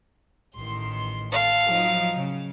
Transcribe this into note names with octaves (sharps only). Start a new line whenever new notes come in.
A1 D#3 C6
A4 F5
F3 F#3 D#4
C#3